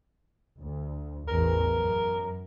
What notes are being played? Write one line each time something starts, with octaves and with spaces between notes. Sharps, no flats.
D2
A1 E2 A#4
F#2